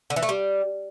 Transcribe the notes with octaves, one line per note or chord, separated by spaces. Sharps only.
D3
E3
A3
G3